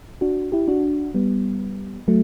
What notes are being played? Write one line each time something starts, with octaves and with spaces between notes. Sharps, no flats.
D4 F#4
E4 G4
D4 F#4
G3 B3
F#3 A3